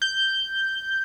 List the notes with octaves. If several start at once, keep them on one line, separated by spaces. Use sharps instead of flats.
G6